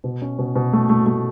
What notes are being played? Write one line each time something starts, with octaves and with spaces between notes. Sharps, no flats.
B2
C#4
B2
B2
A3
A3
A3